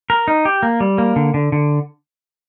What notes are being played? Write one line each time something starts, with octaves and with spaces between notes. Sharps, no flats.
A#4
D#4
G4
A#3
G3
A#3
D3
D3
D3